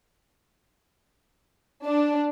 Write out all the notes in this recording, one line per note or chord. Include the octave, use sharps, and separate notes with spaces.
D4